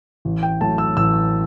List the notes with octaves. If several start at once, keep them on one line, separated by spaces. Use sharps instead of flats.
A1
G5
A2 F#3 A3 A5
E6
A1 E6